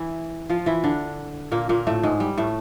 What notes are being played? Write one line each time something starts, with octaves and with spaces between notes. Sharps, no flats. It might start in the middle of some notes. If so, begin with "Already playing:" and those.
Already playing: E3 E4
F3 F4
E3 E4
D3 D4
A#2 A#3
A#2 A#3
A2 A3
G#2 G#3
G3
A2 A3